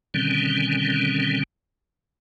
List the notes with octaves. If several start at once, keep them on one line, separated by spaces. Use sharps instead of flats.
B2 D3 D#3 G3 C4 C#4